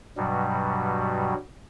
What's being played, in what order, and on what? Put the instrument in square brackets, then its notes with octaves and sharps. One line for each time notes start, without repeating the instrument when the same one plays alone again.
[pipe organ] G2 B2 F#3 G3